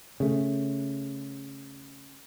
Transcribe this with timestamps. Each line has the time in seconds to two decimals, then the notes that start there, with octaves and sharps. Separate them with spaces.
0.20 C#3 A3